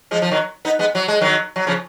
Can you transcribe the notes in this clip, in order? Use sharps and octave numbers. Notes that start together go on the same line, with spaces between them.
F3 G#3
F3
D#3 F#3
B3 D#4
G#3 B3
F#3
G#3
D#3 F#3
F#3
C#3 F3